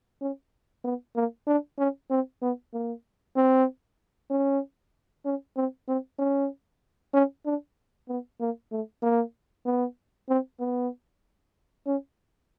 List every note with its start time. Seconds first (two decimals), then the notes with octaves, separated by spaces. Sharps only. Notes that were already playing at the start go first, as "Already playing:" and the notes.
0.21 C#4
0.84 B3
1.16 A#3
1.47 D4
1.78 C#4
2.10 C4
2.42 B3
2.74 A#3
3.36 C4
4.31 C#4
5.25 C#4
5.57 C4
5.88 C4
6.19 C#4
7.14 C#4
7.45 D4
8.08 B3
8.40 A#3
8.72 A3
9.03 A#3
9.66 B3
10.29 C4
10.60 B3
11.86 C#4